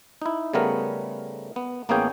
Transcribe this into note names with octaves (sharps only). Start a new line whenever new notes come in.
D#4 E4
C#3 G3 A3 B3 A#4
B3
A1 A#3 B3 C#4 G#4 G5